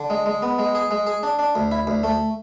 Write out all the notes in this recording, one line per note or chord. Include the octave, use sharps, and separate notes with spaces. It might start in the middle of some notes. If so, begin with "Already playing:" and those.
Already playing: D3
G#3
G#3
B3
G#3
G#4
G#3
G#4
D4
D4
D2
E4
D2
A3